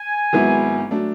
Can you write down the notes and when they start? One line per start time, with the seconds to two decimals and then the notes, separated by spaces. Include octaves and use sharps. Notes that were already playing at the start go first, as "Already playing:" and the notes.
Already playing: G#5
0.33 G#1 G#2 F#3 B3 E4
0.91 F#3 A3 D4